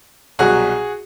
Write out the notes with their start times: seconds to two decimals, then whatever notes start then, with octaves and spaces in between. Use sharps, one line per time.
0.39 C2 B2 F#3 F#4 G#4